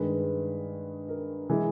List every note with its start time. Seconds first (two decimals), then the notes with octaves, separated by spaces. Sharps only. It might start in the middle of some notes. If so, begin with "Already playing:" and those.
Already playing: G2 D#3 G#3 B4
1.09 A#4
1.50 E3 G#3